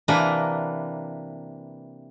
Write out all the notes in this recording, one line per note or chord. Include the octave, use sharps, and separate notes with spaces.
C3 E3 A#3 D4 B4 A#5